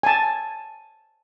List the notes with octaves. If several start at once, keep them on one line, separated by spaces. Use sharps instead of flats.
G#5 A5